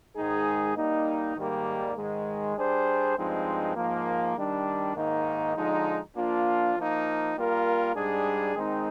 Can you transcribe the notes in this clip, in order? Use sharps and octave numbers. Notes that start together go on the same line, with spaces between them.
G#2 D#3 G#3 D#4 G#4
G3 A#3 D#4
G#2 D#3 G3 A#3
G#2 D#3 G#3
G3 D4 G#4 C5
G2 F3 G#3 C4 D#4
G#2 F3 A#3
D#3 G3 D4
G#2 D#3 A#3 D#4
D3 F3 G#3 D#4
F3 A#3 D4 F4
F3 A#3 D#4
G3 A#3 F4 A#4
G#2 G3 D4 G#4
D#3 G#3 C4 D#4